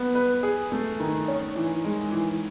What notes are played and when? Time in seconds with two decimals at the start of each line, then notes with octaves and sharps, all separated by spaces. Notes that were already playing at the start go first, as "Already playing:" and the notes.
Already playing: B3
0.15 B4
0.43 G#4
0.72 A3
1.00 D#3
1.28 C#4
1.56 E3
1.85 G#3
2.12 E3